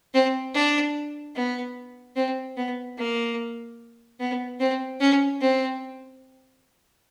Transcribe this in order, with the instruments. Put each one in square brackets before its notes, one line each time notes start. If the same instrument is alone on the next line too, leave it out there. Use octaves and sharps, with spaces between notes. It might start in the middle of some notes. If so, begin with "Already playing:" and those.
[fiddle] C4
D4
B3
C4
B3
A#3
B3
C4
C#4
C4